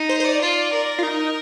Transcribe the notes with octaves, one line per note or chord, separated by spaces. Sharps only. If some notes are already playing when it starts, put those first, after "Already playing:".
Already playing: D#4
C5
C5
D5
F4
A#4
F4
D#4